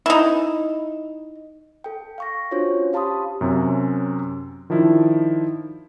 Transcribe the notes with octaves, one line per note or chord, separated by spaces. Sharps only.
D#4 E4
A4 G5
F5 C#6 A#6
C#4 D4 F4 F#4 C5 C#5
G4 F5 A5 B5 C6 D#6
F#2 C3 C#4
D#3 F3 D4 E4